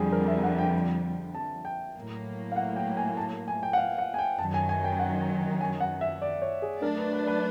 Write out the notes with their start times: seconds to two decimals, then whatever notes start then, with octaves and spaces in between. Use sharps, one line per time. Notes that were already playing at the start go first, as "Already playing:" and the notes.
Already playing: F2 D3 G3 G#4
0.12 A#4
0.28 E5
0.43 F#5
0.59 G5
1.35 A5
1.65 G5
1.95 A2 F#3 A#3
2.52 F5
2.56 F#5
2.76 G5
2.97 G#5
3.17 A5
3.48 G#5
3.63 G5
3.73 F#5
3.78 F5
3.98 F#5
4.14 G#5
4.18 G5
4.38 F#2 D#3 F#3 A5
4.54 G#5
4.69 G#5
4.84 G5
4.99 F#5
5.61 G#5
5.80 F#5
6.01 E5
6.22 D5
6.42 C#5
6.62 G#4
6.82 F#3 A3 D4 A#4
6.98 B4
7.13 B4
7.27 B4